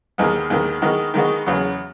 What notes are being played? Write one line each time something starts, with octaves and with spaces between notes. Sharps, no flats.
D#2 D#3 G#3 B3
D#2 D#3 G#3 B3
D#3 G#3 B3 D#4 F#4
D#3 G#3 B3 D#4 F#4
E2 C#3 F#3 B3